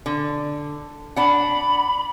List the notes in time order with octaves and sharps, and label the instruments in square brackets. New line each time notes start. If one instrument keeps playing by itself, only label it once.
[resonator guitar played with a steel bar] D3
[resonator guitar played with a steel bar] D4 F#5 [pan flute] B5